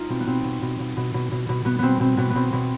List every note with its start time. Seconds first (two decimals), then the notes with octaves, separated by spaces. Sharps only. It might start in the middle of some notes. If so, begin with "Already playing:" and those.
Already playing: D#4 F4
0.09 B2 C4
0.20 B3
0.27 B2 C4
0.44 B2
0.62 B2
0.79 B2
0.97 B2
1.14 B2
1.32 B2
1.49 B2
1.65 B2 B3
1.79 B2 B3 C4
2.00 B2 C4
2.17 B2 B3
2.30 B3
2.35 B2 C4
2.53 B2